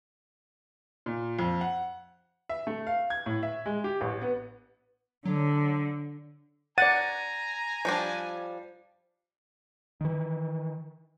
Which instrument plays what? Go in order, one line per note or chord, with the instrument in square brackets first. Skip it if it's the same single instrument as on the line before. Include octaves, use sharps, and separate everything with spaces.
[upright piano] A#2
F2
F#5
E5
A3
F5
G#6
A2
E5
G#3
G4
A1
B3
[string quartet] D3 [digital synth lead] F#3
[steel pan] D5 F#5 [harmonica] G#5 A#5 [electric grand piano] A6 D#7
[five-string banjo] F3 G3 D4
[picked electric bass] D#3 E3